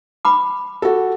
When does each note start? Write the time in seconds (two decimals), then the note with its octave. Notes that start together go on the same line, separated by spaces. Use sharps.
0.25 B5 D6
0.82 F#4 A4